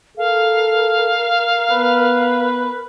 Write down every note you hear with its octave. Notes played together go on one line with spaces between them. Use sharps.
A4 A#4 F5
B3 B4